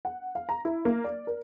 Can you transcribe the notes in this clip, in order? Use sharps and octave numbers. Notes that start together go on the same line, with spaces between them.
F#5
F5
A#5
E4
A#3
D5
A#4